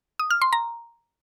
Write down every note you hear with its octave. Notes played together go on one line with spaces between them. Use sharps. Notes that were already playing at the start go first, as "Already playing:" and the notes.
D#6
F6
C6
A#5